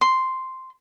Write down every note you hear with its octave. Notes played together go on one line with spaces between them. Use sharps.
C6